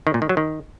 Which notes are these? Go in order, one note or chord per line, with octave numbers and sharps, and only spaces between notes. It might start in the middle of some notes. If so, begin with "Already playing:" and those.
D#3
A#2
D#3
F#3
D#3